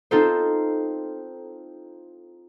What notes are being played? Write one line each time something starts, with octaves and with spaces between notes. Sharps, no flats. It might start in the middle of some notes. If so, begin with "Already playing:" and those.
C4 D#4 F4 A4 C5